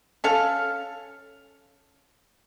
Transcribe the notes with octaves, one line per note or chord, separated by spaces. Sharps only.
C#4 A4 F5